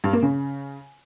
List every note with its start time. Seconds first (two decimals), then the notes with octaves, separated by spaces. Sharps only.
0.04 G2
0.13 A#3
0.23 C#3